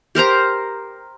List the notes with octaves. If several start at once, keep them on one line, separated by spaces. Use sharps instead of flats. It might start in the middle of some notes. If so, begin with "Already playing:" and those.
G4 A#4 C5 A#5